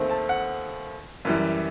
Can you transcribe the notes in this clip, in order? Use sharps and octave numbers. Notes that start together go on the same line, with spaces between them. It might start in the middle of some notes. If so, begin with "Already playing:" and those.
Already playing: D#2 D#3 A3 C4
A5
F#5
F#2 E3 G3